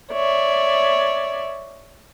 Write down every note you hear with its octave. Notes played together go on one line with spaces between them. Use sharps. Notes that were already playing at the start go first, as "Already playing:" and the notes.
C#5 D5 E5